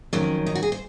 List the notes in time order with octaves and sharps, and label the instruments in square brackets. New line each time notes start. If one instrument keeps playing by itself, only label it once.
[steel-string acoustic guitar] F2 D#3 F#3 C#4
D#4
F#4
G#4
C5